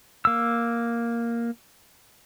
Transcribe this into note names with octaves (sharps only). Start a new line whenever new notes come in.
A#3 E6